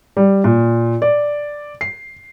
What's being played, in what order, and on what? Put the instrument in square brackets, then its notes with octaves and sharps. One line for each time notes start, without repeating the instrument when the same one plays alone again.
[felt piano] G3
A#2
D5
C7